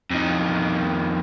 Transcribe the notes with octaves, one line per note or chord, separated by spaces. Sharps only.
F2 D#3